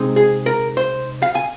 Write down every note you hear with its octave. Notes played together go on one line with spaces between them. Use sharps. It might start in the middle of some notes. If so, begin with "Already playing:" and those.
Already playing: C3 G#3 C4 D#4
G#4
A#4
C5
F5
G#5